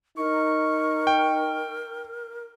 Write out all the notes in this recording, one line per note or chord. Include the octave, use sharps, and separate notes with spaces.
D#4 A#4 C#6
G5